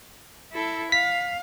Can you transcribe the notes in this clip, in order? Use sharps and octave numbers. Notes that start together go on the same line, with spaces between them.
E4 A4
F5 B6